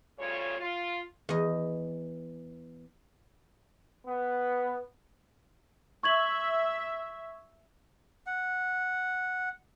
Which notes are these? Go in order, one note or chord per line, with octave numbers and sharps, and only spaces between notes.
D2 C#3 G3 F4 C#5
F4
E2 D#5
B3
E5 C#6 G#6 F#7
F#5